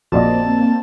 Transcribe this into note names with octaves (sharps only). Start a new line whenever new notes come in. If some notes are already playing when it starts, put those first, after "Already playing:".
A#1 F2 A#3 C4 F#4 D5 D#5 A5